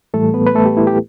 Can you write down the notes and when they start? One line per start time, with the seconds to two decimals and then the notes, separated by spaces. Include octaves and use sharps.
0.14 A2 E3 G3 A3 A4
0.34 B3 B4
0.47 B4
0.55 A3 A4
0.65 G4
0.77 E4
0.87 G4